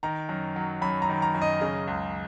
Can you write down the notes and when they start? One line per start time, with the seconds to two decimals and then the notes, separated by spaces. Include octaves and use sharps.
0.03 D#3 A#5
0.29 F#2
0.56 F#3
0.82 F#2 B5
1.02 A#5
1.09 D#3
1.22 A#5
1.35 F#2
1.42 D#5
1.61 C#3 D#5
1.87 C#2